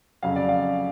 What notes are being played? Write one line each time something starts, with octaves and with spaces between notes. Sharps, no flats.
F2 C#3 F#3 F5
D5
F5